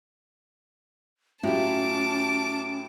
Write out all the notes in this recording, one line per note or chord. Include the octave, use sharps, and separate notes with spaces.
A2 F#3 C#4 E4 F4 G4 A5 D6